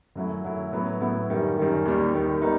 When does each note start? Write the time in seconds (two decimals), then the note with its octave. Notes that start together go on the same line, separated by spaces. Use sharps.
0.15 F#2 F#3 A3 E4
0.44 F#2 F#3 A3 E4
0.72 A2 F#3 B3 E4
1.00 A2 F#3 B3 E4
1.29 F#2 D#3 G3
1.57 F#2 D#3 G3
1.85 D#2 D#3 G3
2.13 D#2 D#3 G3
2.42 D#3 G3 B3 D#4